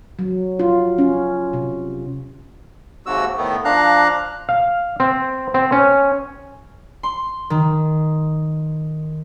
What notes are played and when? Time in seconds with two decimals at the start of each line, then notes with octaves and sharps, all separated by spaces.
0.19 F#3
0.59 F4
0.98 C#4
1.53 C3
3.06 D#2 G#2 C3 F#4 E6
3.37 A2 D#3 A3 B3
3.65 F3 D4 F5 A#5 F#6
4.49 F5
5.00 C4
5.54 C4
5.72 C#4
7.03 C6
7.50 D#3